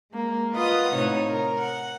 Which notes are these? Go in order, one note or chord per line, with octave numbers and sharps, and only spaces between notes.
G#3 A#3
F4 B4 D#5 F5 F#5 D#6
A2 C3 D#4 C#5
A#4
F#5